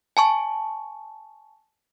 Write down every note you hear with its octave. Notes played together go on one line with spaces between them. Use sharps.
G#5 A5 C#6